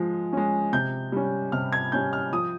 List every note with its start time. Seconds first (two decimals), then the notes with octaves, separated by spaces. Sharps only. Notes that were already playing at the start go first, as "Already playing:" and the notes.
Already playing: F3 G#3
0.33 G#3 C#4
0.73 C3 G6
1.12 G3 C#4
1.52 C3 F6
1.72 G#6
1.92 G3 C#4 G6
2.13 F6
2.33 F3 D#6